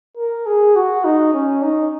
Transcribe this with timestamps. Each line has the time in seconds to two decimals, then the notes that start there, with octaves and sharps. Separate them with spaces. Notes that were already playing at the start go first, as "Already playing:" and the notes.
0.18 A#4
0.46 G#4
0.76 F#4
1.04 D#4
1.34 C#4
1.62 D#4